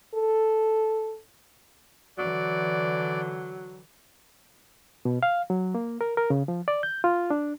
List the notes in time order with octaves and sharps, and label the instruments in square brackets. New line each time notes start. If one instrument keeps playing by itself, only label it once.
[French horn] A4
[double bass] D3 E3 [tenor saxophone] F#3 [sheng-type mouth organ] D5
[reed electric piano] B2
F5
F#3
A#3
A#4
A#4
C#3
F3
D5
G6
F4
D4